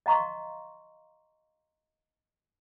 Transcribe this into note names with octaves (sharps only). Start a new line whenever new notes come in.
D#5 F5 A#5 C6 C#6